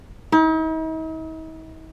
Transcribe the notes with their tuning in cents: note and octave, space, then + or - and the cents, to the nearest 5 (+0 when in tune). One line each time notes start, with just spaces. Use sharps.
D#4 +45